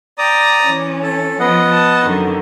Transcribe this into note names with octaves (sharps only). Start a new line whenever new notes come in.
D5 G5 A#5 D#6
E3 C#4
A4
F3 B3 D#5 F#5
A5
F#2 D3 D#3